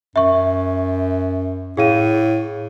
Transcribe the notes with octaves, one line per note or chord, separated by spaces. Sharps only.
F#2 E5 C#6
A2 G#4 F5 D#7